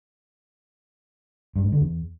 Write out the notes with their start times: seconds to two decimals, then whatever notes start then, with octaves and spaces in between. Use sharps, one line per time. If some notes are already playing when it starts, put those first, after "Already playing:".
1.56 G2
1.64 G#2
1.72 D3
1.81 E2